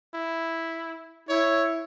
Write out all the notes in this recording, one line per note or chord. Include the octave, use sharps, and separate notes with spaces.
E4
E4 C#5